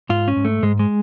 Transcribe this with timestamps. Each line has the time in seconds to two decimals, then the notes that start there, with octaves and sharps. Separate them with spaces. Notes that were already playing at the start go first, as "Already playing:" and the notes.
0.09 G#2 F4
0.28 C#4
0.36 G#2
0.45 A3
0.63 G#2 G#3
0.79 G#3